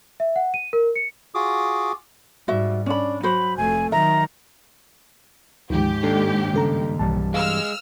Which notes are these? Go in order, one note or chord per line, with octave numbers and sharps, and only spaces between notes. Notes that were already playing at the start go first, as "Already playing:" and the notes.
E5
F#5
D#7
A#4
C#7
F4 F#4 G#4 D6 D#6
G#2 G3 F#4 E5
C#4 D4 B5
F#3 F#4 C5 B5
F1 A3 G#5
D#3 F#3 E5 A#5
D2 G#2 D#3 F3 G4
D#2 D4 A4
G2 C#3 A4 A#5
B1 G2 E3 G3 A5
G#3 F5 E6 F6